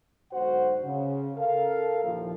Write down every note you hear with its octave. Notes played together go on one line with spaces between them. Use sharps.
B1 G#2 D3 F#4 C5 F#5
C#3
A4 A#4 F5
D#2 A#2 E3 F3